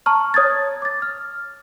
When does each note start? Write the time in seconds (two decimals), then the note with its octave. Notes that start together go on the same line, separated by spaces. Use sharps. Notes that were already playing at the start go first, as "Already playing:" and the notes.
0.06 A5 A#5 C#6 F6
0.34 C#5 D#6 G#6 A6
0.82 D6 A6
1.02 F6